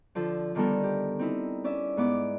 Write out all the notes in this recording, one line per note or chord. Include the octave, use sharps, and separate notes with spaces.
D3 F3 A4
D3 D#3 G3 B3 A4 A#4
G4
C4 D#4 E4
C#4 D5 E5
G#2 B3 D6